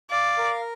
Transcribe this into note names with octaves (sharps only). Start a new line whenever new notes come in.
D5 F5
A#4